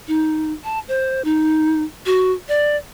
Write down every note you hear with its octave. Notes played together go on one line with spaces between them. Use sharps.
D#4
A5
C5
D#4
F#4
D5